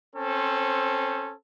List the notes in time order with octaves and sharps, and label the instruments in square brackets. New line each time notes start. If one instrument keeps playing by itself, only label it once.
[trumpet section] C4 C#4 A4 C5